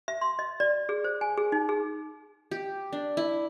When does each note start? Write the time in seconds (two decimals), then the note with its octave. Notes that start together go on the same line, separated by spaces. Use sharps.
0.08 E5
0.21 C6
0.39 D#5
0.60 D5
0.89 G#4
1.04 C5
1.21 G#5
1.37 G#4
1.52 D#4
1.69 G#4
2.51 G4
2.93 D4
3.17 E4